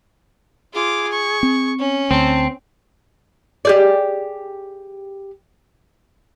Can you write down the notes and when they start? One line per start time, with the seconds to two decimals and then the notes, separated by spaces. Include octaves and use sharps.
0.74 F4 G#4 D6
1.12 C#6
1.43 C4
1.79 C#4
2.11 D2 C4 A5
3.65 G4 G#4 D5